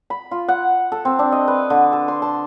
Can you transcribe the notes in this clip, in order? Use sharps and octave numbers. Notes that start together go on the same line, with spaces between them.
B5
F4
F#5
A4
C4
D4
D#5
B4
D3
A4
C6
A5